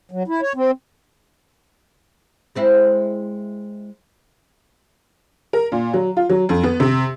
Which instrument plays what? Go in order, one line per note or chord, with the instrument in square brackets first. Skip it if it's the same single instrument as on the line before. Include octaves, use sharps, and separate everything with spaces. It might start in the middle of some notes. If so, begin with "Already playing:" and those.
[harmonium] F#3
E4
C#5
C4
[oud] G#3 C4 E4
[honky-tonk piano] A#4
A#2
F#3
F4
F#3
F2
B3
C3